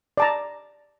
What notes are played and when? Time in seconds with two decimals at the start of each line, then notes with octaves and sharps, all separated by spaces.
0.17 D5 A5 A#5